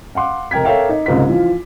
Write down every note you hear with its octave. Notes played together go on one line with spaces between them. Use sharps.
F5 F#5 C6 D6
F1 A#4 G5 G#6 B6
A4 A#4 C#5 E5 F5 G5
D#4
F#1 C2 G#2 F4 B6
E3 F3 F4